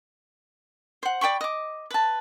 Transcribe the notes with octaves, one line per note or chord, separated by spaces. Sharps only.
C5 F#5
D5 G5 B5 C#6
D#5 D6
B4 A5